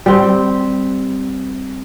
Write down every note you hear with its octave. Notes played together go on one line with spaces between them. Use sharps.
G3 C4